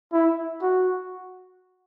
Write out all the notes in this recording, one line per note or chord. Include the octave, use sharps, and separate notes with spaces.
E4
F#4